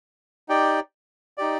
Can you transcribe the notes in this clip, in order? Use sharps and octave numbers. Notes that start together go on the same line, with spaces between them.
D#4 G4 D5 G5
D#4 G4 D5